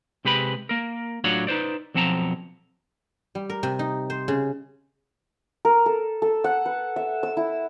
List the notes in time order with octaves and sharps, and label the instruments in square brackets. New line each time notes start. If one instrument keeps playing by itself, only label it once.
[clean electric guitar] C3 G#3 G4 B4 B5
A#3 A#4
A2 F#3 D4 F4 C#5 F#5
D#4 B4 C5 D5
B1 F3 C4 F#5 A5 A#5
[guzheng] G3
A#4
C3
D#4
C5
C#3
[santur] A#4
A4
A4
F#5
B4
E5
E6
E4